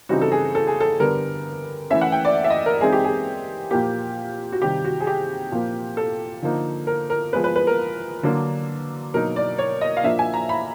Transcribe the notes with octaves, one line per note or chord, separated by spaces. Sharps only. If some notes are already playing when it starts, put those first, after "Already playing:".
C#3 E3 G3 C4 D#4 F#4
A4
G#4
A4
G#4
A4
D3 G3 B3 A#4
E3 A3 C#4 E5
F#5
G5
D5
E5
D#5
A#4
E3 G#3 C4 D#4 G#4
G4
G#4
A#2 F3 A#3 G4
F#4
C3 D#3 G3 G4
F#4
G#4
G4
A#2 F3 A#3
A4
D3 F3 A#3 D#4
A#4
A#4
F3 G#3 B3 B4
B4
B4
A#4
D3 F#3 A#3 D4
B2 F#3 A#3 D#4 A#4
D5
C#5
D#5
F5
A#2 F3 A#3 D4 E5
G#5
A#5
B5